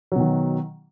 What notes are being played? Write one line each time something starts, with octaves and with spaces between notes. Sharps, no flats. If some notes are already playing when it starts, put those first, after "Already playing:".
B2 D#3 F#3